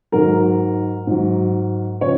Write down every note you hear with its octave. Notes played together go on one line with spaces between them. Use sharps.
G#2 D#3 F#3 A#4
G#2 D#3 F#3
C#3 F3 C#5